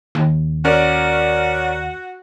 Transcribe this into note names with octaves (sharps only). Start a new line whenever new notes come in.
D#2
C#4 F#4 A#4 D5